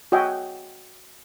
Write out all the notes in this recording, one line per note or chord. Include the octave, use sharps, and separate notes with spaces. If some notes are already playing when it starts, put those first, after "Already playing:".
F#4 C#5 D#5 E5 G5 G#5